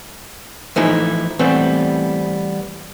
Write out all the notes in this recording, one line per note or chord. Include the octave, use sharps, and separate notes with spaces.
E3 F3 A3 D#4 E4
E3 G3 A3 B3 C4